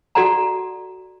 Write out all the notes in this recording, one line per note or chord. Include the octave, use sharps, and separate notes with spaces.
F#4 A4 D5 F#5 A#5